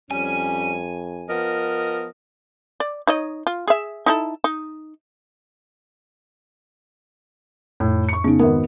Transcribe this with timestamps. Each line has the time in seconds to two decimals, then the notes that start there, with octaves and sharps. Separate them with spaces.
0.11 F2 G3 C#4 G#5
1.29 F3 B3 A#4 D#5
2.80 D5
3.07 D#4 C#5 D#5
3.47 F4
3.68 G#4 E5
4.06 D#4 E4 A4
4.44 D#4
7.80 F2 A2
8.09 C#6 C#7
8.24 C#3 B3 D#4
8.40 G#1 B3 A#4